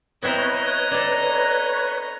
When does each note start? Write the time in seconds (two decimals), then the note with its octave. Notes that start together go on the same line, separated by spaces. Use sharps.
0.23 B3 C4 E4 B4 C#5 D#5 A#5
0.91 D4 A4